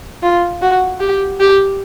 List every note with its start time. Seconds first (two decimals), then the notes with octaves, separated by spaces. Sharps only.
0.23 F4
0.62 F#4
1.01 G4
1.40 G4